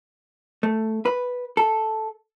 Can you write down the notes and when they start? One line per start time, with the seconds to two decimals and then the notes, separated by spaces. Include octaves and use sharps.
0.63 A3
1.05 B4
1.57 A4